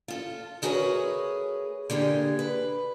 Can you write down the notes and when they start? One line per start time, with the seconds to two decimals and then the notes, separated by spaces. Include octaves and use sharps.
0.08 F4 A4
0.62 A3 F#4 G#4 A#4 B4 C#5
1.90 D3 A#3 G4 G#4
2.39 B4